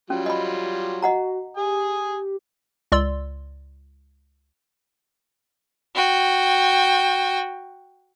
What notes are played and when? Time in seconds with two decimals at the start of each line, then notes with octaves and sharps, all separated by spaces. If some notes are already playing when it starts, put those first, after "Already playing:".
0.10 F#3 G3 C#4 F4
0.26 D#5 B5
1.02 F#4 D#5 F#5 A#5
1.57 G4 G#5 D#6
2.92 C#2 D5 C6 E6
5.95 F#4 G5